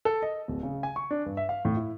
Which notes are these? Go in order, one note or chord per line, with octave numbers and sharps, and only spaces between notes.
A4
D#5
D1
C#3
G#5
C#6
D4
G2
E5
F5
A2
E4